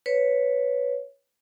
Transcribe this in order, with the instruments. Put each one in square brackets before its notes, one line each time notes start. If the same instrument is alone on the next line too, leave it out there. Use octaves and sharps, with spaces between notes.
[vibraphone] B4 C#5